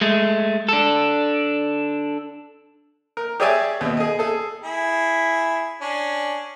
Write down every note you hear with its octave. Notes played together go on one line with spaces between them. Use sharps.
G#3 A3
D4 A4
A#4
G4 G#4 C#5 D5 E5 G#5
D#2 B2
G#4 D#5
G#4 A4
E4 G#4
C#4 D4